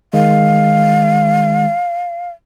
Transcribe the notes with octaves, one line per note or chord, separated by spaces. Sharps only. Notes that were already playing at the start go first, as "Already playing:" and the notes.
D#3 G#3 F5